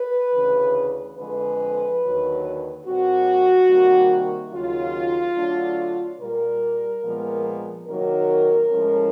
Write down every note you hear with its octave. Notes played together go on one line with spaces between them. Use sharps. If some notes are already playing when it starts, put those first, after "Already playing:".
Already playing: B4
D2 C#3 E3
F2 D3 F3 G#3 B4
D#2 D3 F#3
A#2 G3 C4 F#4
C3 D#3 G3 A#3
D#2 C#3 F#3 F4
D3 F#3 A3 D4
A#2 G3 A#3 A#4
A#2 F3 G#3 B3
C3 D#3 F#3 A#3 D#4 A#4
A2 F3 G#3 C#4